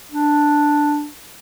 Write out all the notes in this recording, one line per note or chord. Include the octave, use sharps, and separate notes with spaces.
D4